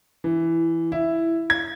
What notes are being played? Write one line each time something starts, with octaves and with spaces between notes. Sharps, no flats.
E3
E4
G#6